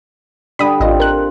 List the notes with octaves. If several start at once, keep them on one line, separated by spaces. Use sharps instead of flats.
D3 G3 B5 D#6
A1 C4 F4 D#5
A#4 F#6